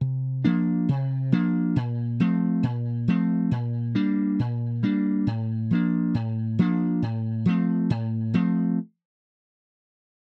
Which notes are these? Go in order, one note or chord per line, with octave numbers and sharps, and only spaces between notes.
C3
F3 A#3 D4
C3
F3 A#3 D4
A#2
F3 A3 C4
A#2
F3 A3 C4
A#2
G3 A#3 D4
A#2
G3 A#3 D4
A2
F3 A#3 D4
A2
F3 A#3 D4
A2
F3 A3 C4
A2
F3 A3 C4